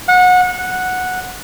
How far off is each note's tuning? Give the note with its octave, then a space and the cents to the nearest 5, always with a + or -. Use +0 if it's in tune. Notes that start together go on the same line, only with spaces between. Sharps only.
F#5 -25
F#5 -10